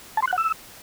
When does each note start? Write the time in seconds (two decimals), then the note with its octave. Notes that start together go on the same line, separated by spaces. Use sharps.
0.17 A5
0.22 C6
0.28 F#6
0.33 F#5
0.38 E6